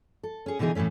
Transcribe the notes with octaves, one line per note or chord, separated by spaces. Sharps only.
A4
C#4 G#4
B2 D3 E3 D#4 G#4
A2 E3 F3 A3 C#4